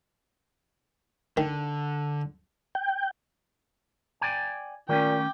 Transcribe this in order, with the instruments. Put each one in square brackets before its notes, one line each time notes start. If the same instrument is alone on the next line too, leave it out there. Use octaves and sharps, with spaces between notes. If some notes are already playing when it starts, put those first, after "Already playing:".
[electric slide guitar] D3 [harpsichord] D#3
[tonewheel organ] G5
[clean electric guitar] D5 G5 G#5
[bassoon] A#2 [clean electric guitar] D#3 A3 C#4 [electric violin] G5 D6